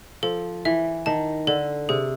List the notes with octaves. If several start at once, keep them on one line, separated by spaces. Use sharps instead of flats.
F3 A4
E3 E5
D#3 A5
D3 A4
C3 G#4